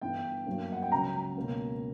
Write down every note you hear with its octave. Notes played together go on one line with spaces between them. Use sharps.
G1 G2 E3 G5
G1 G2 F#3 A#3
F#5
G5
C#2 C#3 F#3 A#5
C#2 B2 A#3 C#4